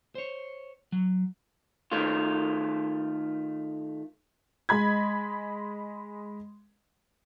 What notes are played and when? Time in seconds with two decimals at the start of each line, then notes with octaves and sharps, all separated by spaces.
0.15 C5 C#5
0.92 F#3
1.92 D#3 A3 F4
4.69 G#3 D#5 B5 G#6